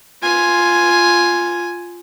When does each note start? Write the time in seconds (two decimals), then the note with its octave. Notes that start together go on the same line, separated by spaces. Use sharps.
0.23 F4 G#5